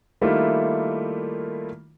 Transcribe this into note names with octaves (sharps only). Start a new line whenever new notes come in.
D#3 G3 A3 A#3 E4 F4